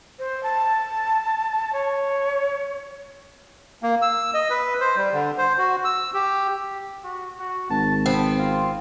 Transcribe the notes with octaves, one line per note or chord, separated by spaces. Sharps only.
C5
A5
C#5
A#3
E6
D#5
B4
C5
G3
D3
C5
F#4
E6
G4
F#4
F#4
G#1 A5
B3 C4
F4